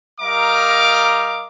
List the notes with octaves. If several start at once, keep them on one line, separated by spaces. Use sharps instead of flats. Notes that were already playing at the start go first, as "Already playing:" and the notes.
G3 A#4 D#5 F5 A#5 D6